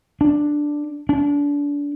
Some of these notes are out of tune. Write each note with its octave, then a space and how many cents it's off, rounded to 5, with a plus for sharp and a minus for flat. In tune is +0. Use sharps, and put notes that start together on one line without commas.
D4 +5
D4 -30